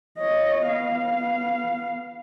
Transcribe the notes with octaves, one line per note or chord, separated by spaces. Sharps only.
C#5 D#5
B3 F5